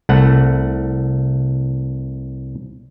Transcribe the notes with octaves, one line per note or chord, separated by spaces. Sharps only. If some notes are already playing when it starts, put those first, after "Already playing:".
C2 A3 F#5